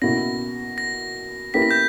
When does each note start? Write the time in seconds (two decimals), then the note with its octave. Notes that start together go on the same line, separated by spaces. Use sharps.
0.02 B2 A#3 C#4 E4 A#6
0.78 A#6
1.54 A#3 C#4 E4 G4 B4 B6
1.62 A#6
1.71 G6